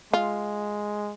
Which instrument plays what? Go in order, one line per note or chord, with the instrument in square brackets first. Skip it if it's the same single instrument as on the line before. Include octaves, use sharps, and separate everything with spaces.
[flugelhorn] G#3 [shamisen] F4